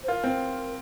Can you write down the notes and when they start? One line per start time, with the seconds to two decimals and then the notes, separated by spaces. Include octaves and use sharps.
0.03 C5
0.08 F4 A#4
0.24 C4